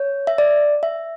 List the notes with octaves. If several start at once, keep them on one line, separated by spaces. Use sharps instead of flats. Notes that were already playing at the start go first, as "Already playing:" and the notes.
Already playing: C#5
E5
D5
E5